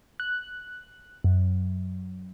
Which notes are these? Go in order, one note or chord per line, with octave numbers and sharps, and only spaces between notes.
F#6
F#2